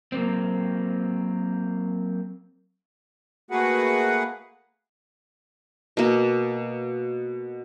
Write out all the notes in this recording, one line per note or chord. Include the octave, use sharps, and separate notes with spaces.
F#3 A#3 C4
A3 A#3 F#4 G#4 B4 F#5
B2 A#3